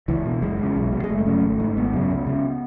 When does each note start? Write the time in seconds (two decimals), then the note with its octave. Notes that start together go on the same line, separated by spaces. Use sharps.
0.08 C#2 E3
0.25 B2
0.42 F#1 G#3
0.58 E2 C#3
0.76 B1
0.92 B2
1.04 G#3
1.09 F#1 A3
1.26 F#2 C#3
1.43 G#1
1.60 G#2
1.77 G#1 B3
1.93 F#2 C#3
2.11 C#2
2.27 C#3